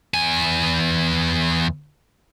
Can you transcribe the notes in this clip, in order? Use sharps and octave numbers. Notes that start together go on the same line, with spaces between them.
E2 G#5